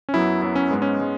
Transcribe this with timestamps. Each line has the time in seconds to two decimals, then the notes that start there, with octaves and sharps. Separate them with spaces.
0.09 C#4
0.14 F#2 F#3 B3 E4
0.42 F#2 F#3 B3 E4
0.56 C#4
0.71 G#2 G#3 B3
0.82 C#4
1.01 G#3